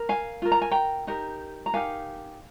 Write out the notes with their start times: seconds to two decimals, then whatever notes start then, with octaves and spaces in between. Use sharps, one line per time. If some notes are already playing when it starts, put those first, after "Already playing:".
Already playing: A#4
0.09 F5 G#5
0.42 F4 A#4
0.52 A#5
0.62 G#5
0.71 G5 A#5
1.07 D#4 G4 A#4
1.66 A#5
1.73 D#4 G4 A#4 F5 G#5